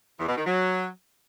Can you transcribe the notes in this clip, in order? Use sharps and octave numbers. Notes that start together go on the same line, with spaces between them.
E2
B2
D#3
F#3